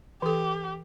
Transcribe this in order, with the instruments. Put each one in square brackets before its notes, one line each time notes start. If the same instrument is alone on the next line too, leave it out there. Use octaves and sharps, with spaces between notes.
[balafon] E3 A4 [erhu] G4